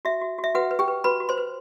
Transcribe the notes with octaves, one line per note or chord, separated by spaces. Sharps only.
F#4 E5
F#4
F#4
E5
F#4 B4 F#5
B4
G4 G5
B4
F#4 B4 B5
F#4
C5 C6
B4